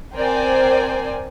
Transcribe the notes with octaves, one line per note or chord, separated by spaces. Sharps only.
C4 A#4 C5 D5 G5 G#5